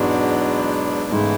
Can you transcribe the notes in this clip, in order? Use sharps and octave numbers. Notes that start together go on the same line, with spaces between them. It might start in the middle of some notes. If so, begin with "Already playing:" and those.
Already playing: E2 G#2 B2 F#3 B3 D4
E2 G#2 C#3 E3 A3 E4